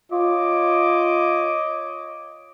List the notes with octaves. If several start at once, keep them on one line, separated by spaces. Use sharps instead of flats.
F4 C#5 D#5 D6